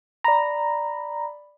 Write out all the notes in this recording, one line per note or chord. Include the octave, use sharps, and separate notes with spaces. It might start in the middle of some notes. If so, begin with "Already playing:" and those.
D5 A#5 B5